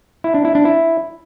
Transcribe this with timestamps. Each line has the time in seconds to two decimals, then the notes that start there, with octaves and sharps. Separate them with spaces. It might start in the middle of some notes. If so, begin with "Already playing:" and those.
0.24 E4
0.35 D4
0.45 E4
0.55 D4
0.65 E4